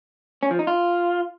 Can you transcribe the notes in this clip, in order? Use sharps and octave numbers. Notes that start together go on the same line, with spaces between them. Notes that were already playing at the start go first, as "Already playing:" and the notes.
C#4
F3
D#4
F4